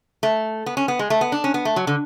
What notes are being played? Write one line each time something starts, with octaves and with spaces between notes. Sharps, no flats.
A3
B3
C#4
B3
G#3
A3
B3
D4
C#4
B3
A3
F#3
D3